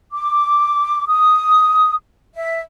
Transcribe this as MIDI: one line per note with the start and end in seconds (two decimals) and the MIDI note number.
0.12 1.05 86
1.07 1.93 87
2.35 2.61 76